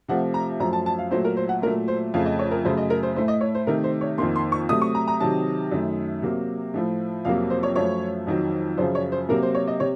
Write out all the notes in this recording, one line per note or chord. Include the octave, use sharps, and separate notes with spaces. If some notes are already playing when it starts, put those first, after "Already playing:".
C3 F3 A3 F#5
A#5
F#2 F3 A3 A#5
A5
A5
F5
A#2 F#3 A3 C5
A#4
C5
F#5
A#2 F#3 A3 A#4
C5
F2 C#3 A3 F5
D#5
C#5
A#4
F#2 C#3 A3 C5
D#5
A#4
C5
A2 A3 C5
D#5
C#5
C5
C3 D#3 A3 A#4
C5
C#5
F2 D#3 A#3 C6
C6
C#6
C3 F#3 A3 D#6
C#6
A#5
A#5
C3 D#3 F#3 A5
F#2 D#3 A3
C3 F#3 A#3
A2 F3 A3
F2 C3 F#3 A#3 F5
C5
C#5
F#2 F3 A3 C#5
F2 D#3 F#3
F#2 C#3 F3 C5
C#5
C5
C3 F#3 A#3 A#4
C5
C#5
D#5
C3 C#5